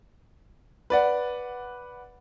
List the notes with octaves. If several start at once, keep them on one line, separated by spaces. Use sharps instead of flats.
B4 D5 F#5